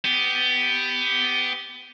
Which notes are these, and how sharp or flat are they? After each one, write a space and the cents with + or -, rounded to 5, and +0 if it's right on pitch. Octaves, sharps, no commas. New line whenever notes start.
B3 +20 G4 +0